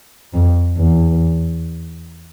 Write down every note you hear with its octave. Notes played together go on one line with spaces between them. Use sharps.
F2
E2